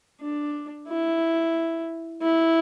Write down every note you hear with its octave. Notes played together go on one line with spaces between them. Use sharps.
D4
E4
E4